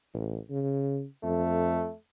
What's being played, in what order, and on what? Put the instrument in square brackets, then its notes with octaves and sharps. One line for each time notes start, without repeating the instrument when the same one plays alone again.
[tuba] A1
C#3
[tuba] F2 [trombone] A3